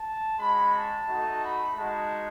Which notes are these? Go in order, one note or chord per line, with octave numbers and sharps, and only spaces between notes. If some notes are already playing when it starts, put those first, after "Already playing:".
Already playing: A5
G#3 C#4 F#4 B5
A5
A3 D#4 F#4
B5
G#3 D#4 F#4 A5